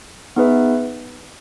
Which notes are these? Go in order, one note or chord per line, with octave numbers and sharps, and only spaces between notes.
B3 D#4 G#4 B4 E5